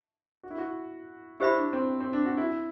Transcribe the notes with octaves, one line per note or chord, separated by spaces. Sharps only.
F#4
E4
F#4
E4 G4 C5 E5 B5
D4
C4
C4
D4
F#4
E4